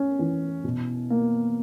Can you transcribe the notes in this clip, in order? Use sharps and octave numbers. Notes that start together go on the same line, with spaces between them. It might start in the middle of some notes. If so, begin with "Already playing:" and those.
Already playing: C#4
E3
B2
A#3